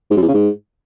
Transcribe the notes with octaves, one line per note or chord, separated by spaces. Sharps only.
G#2
F#2
E2
C#3
G#2